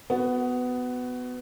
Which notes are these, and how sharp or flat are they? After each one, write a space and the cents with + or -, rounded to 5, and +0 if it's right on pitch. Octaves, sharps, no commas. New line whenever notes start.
B3 +15 F#4 +0